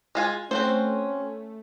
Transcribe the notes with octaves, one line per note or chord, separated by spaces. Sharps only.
G#3 F4 G#5
A3 C4 C#4 F#4 C5